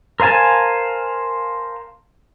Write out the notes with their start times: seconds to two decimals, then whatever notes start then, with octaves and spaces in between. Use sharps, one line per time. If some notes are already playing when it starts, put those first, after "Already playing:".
0.20 A#4 C5 F5 G#5 A5